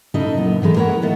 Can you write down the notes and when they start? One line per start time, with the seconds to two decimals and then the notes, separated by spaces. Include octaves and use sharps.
0.14 C#3 D#4 E4 A4 D#5
0.37 F#2 A#2 B3
0.62 A2 E3 G#3 A3 A#5
0.76 E4 A#4 B4 C#5 E5 F#5
1.02 D#3 A3 B3